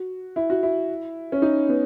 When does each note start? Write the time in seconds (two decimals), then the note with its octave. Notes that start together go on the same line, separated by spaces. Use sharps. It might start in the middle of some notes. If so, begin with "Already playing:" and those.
Already playing: F#4
0.36 E4
0.50 F#4
0.63 E4
1.32 C#4
1.42 D#4
1.69 B3